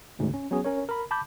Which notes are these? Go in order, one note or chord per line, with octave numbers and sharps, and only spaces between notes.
A1 D2 G#2 C#3
C#4
F#3 B3 C#4 G#4
C#4 A#4 C#5
A#4 B5
A5 B5 D6 G6